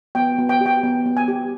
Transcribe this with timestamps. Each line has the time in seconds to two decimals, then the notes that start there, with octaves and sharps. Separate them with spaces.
0.15 B3 G5
0.38 B3
0.49 G5
0.61 G4 G5
0.83 B3
1.06 B3
1.17 G#5
1.28 G4